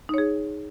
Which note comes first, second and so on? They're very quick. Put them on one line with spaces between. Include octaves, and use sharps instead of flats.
D#4 C#5 G#4